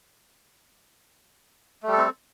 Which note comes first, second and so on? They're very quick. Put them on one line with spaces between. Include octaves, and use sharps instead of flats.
A3 G3 A4 C4